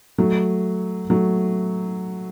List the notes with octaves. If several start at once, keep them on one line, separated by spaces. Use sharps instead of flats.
F#3 A3
F#3 A3